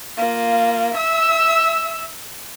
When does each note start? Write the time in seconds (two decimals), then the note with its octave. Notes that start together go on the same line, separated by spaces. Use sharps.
0.17 A#3 F4
0.94 E5 E6